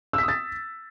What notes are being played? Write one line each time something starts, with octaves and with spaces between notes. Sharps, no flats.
D#6 E6 A6 B6